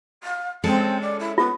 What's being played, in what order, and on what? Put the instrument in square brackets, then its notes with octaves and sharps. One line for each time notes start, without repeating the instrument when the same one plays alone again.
[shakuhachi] F5
[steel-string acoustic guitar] G#3 C#4 A4 [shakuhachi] C4
[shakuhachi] D5
E4
[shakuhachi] B3 [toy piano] F4